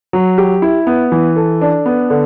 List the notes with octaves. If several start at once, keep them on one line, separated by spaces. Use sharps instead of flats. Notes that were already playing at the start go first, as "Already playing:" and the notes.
F#3
G4
E4
B3
E3
A4
D4
B3
D3